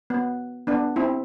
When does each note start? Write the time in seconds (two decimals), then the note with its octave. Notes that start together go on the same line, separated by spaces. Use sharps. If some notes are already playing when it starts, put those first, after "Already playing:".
0.10 B3
0.67 B3 D4
0.96 C4 E4